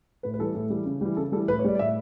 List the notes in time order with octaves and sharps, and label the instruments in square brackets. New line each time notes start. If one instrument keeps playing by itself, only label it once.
[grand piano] A2 B4
B4
E3 G3 A4
A2
E3 G3
C#3
E3 G3
C#3 A4
G3 A4
E3
A2 B4
C#5
G3 D5
D5
A2 E5